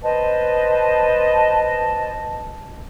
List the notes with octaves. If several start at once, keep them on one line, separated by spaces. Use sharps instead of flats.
B4 C5 D#5 A5